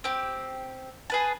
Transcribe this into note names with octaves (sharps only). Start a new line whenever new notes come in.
C4 G4
G#4 B4 A5